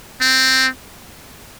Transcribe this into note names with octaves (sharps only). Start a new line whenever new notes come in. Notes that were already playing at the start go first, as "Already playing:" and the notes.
C4